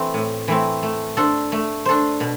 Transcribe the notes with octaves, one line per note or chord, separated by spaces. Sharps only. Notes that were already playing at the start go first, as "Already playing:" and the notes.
Already playing: E3 A3 C4
A2
E3 A3 C4
A3
D4 A4 C5
A3
D4 A4 C5
B2